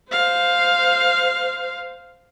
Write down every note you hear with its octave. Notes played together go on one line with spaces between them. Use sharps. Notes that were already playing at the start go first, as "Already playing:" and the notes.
C5 F5